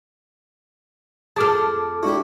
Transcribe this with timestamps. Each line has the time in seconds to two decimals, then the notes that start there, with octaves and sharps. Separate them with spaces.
1.36 F2 G#4 A4 A5 D6 F6
2.03 G#3 D4 E4 F#4 G4